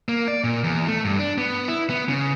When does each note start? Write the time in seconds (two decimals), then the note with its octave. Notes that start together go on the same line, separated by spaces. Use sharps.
0.09 A#3
0.28 D5
0.44 A#2
0.64 E2
0.88 A3
1.05 G2
1.19 D4
1.38 B3
1.68 E4
1.90 B3
2.09 C#3